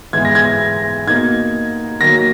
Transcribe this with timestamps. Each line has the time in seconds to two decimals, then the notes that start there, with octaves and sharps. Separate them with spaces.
0.13 G#2 E3 G#3 B3 E4 G#6
0.25 A#6
0.35 G#6
1.07 B2 A#3 D#4 G#6
2.01 D#3 F#3 A#3 A#6